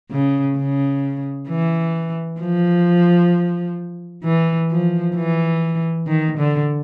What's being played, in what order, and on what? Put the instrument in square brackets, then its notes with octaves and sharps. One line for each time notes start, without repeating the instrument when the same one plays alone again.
[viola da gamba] C#3
C#3
E3
F3
E3
F3
E3
D#3
D3